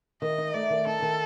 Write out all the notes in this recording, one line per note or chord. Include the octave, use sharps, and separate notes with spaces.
D#3 D#5
D#4
A3 D5
D#3
D#4 A4
D#3